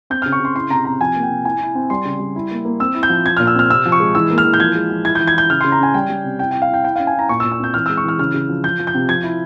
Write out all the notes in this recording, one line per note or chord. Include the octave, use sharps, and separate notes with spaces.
C4 G6
F6
C#3
C#6
C#3 C6
E4 C6
C3 A#5
C3 A#5
F3 G#5
A#3
G5
C3
E4 G#5
E4
C4
G3 C6
C#3
G3
E4
A#3
A#3
C4 E6
E4
G6
F3
F3 G#6
F6
A#2
E6
C4 F6
C3 E6
F3
C#6
G#3
E3 E6
A#3
F6
E3
G6
F3 G#6
G#3
F3
E4 G#6
G6
E3
G#6
E4 G6
C#3 F6
C6
C#3
A#5
C#4 G#5
G3 G5
G3
C3
E4 G5
E4 G5
F5
E4 G5
E4 G5
F5
C#4
G#5
E4 A#5
A#2 C#6
E6
A#2
E6
C4 G6
E3 F6
E6
G#3
C#6
E3 F6
C#3 F6
C#3
F3
F3 G6
F3
G6
C3
F3 G#6
E4